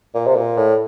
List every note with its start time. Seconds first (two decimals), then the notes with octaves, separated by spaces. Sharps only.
0.14 A#2
0.27 C3
0.36 A#2
0.57 A2